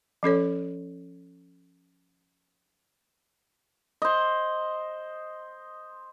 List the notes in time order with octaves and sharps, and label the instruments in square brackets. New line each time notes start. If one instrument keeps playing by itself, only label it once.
[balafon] F3 C#4 A4 C#5
[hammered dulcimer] C5 D#5